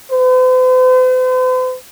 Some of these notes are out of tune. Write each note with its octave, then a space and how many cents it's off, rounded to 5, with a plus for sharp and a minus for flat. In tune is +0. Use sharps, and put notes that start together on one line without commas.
C5 -45